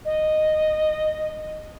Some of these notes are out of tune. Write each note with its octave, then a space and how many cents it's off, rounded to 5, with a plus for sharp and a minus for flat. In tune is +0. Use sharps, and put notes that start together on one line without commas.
D#5 -10